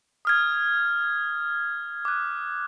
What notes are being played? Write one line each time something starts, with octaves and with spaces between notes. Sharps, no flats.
D#6 F6 G#6
D6 F#6